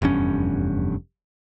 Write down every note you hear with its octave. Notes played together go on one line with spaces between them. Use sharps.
F1 E2 G2 C#4